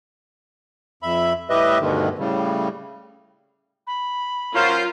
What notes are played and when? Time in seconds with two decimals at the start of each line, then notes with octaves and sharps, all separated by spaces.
1.03 F2 E5 B5
1.50 A2 G3 G4 B4 D#5 E5
1.80 D2 G2 B2 D3 D#3
2.19 A2 C#3 G3
3.87 B5
4.55 F#3 C#4 F4 A#4 C5 F5 G6